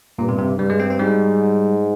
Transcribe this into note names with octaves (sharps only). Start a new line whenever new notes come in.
G2 A#2
C3
C3
G2 G3
G#3
C4
C4
G#2 G3